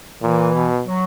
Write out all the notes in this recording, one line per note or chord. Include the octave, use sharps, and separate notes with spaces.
A#2 E3
B2
F#3